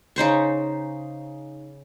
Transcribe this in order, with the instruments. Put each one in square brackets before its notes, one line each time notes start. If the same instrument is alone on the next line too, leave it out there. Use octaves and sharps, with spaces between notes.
[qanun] C#3 D#4 C5 C#6